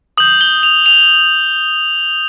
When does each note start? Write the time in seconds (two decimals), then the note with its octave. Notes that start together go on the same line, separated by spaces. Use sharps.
0.17 D#6 G6 F#7
0.41 G7
0.63 F7
0.86 F7